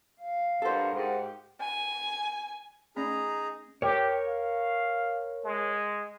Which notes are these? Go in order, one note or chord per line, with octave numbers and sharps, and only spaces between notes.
F5
G2 A4 A#4 C5 F#5
G#2 G4
G#5
A3 C#4 D#4 G#4 D5 A#5
G4 A#4 C#5
F5
G#3